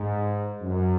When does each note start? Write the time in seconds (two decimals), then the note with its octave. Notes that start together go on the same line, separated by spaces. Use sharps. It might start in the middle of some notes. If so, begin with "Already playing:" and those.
Already playing: G#2
0.62 F#2